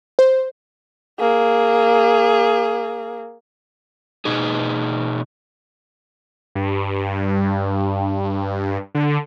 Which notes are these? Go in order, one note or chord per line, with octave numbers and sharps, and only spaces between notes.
C5
A#3 G#4
B2 D#4 G#4
G2
D3